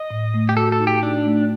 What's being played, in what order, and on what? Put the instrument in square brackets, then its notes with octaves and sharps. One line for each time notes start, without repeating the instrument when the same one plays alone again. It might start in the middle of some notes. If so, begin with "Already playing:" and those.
Already playing: [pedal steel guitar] D#5
[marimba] A2
A3
[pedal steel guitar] G4
[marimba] F#4 [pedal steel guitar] A4
[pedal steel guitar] A4
[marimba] D#4
[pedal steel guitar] G4
[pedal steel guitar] D4 [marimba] D#4
[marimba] A3